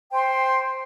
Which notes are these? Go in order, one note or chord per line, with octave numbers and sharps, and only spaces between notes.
C5 G5 C6